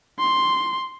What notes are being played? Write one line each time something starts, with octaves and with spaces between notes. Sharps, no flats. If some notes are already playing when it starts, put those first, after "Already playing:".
C6